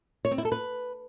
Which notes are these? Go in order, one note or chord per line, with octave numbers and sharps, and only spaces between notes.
C#5
C4
E4
A4
B4